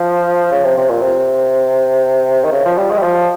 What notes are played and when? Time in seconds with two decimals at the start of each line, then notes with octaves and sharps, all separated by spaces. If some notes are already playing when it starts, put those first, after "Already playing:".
Already playing: F3
0.52 C#3
0.64 C3
0.77 C3
0.89 A#2
1.01 C3
2.44 D#3
2.52 C#3
2.65 F3
2.77 G3
2.91 G#3
2.97 G3
3.03 F3